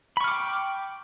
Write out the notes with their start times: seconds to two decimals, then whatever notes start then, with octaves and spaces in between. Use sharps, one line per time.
0.17 B5
0.21 C#6
0.24 F6
0.28 D6
0.32 G5